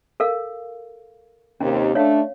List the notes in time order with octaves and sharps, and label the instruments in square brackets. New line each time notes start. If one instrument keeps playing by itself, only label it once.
[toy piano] A4 A#4 F5
[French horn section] D#2 C3 [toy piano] C#4
[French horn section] A3 D4 [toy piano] C#5 F5